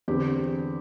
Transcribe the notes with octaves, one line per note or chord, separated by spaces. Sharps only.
E2 D3 C4 G4